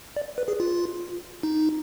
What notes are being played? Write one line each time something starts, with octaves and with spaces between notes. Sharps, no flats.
D5
B4
G#4
F4
D#4